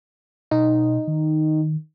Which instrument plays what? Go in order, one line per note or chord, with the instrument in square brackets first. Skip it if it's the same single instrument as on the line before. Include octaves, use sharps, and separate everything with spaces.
[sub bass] B2 [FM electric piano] D#4
[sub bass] D#3